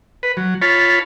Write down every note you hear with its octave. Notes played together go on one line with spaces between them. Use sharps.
B4
F#3
F4 C#5 A5 B5